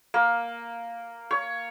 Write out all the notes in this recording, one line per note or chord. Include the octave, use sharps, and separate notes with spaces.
A#3
C#5